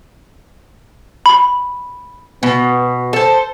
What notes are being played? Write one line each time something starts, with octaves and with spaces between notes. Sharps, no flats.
B5
B2 B3
A4 C5